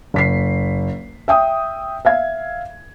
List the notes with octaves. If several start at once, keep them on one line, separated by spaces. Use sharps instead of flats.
F#1 B6 C7
E5 G5 D#6
E5 F5 G#6